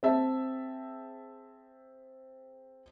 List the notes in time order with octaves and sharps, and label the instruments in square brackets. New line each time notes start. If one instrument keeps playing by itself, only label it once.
[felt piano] C4 G#4 E5 A5